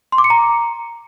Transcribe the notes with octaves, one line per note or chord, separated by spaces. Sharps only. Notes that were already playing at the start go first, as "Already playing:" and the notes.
C6
D6
C#7
A#5